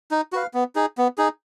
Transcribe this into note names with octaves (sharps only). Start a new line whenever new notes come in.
D#4
F#4 B4 F5
B3
D#4 G#4
B3
D#4 G#4